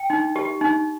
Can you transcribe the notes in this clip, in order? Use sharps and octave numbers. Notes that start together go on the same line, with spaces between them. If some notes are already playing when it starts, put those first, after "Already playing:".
Already playing: G5
D#4
G4
D#4